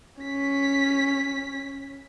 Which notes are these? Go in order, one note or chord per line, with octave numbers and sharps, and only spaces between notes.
C#4 B6